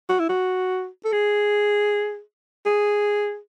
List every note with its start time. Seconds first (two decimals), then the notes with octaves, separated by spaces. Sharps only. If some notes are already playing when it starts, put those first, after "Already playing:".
0.09 F#4
0.19 E4
0.29 F#4
1.05 A4
1.12 G#4
2.66 G#4